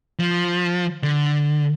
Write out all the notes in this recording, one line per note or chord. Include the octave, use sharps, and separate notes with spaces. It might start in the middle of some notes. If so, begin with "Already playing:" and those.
F3
D3